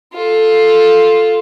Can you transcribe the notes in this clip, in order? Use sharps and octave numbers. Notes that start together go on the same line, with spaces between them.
F4 A4